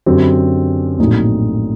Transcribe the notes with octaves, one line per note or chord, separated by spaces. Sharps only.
F#2 D3 F#3 C4 G4
A#1 A2 F#3 C4 D#4